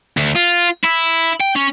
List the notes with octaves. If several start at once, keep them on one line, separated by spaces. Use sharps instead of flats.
D2
F4
E4
G5
C#4